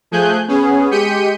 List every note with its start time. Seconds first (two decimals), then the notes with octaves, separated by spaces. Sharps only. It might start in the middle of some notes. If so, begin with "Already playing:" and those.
0.11 F3 A3 G#4 G#5 F#6 G6
0.48 B3 C#4 G#4
0.91 G#3 G4 G6 B6 C#7 D#7